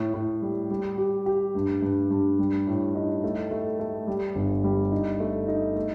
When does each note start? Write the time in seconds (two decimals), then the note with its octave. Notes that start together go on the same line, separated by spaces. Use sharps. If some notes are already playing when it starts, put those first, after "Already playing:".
Already playing: A2
0.14 A2
0.42 G3
0.70 G3
0.98 G4
1.26 G4
1.55 G2
1.82 G2
2.10 G2
2.39 G3
2.67 A2
2.95 D#4
3.24 A3
3.51 A3
3.79 A3
4.07 G3
4.35 G1
4.64 G3
4.92 D#4
5.20 A3
5.48 D#4
5.76 A3